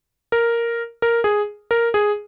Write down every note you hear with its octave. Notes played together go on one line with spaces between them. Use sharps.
A#4
A#4
G#4
A#4
G#4